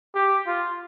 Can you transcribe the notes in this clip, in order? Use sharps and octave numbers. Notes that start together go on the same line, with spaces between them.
G4
F4